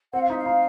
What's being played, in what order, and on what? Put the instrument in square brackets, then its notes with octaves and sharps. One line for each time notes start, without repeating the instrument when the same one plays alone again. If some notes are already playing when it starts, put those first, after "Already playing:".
[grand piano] C4 [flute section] F#5
[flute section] F5
[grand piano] D#4 [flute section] E5
[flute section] F5
[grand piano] D#4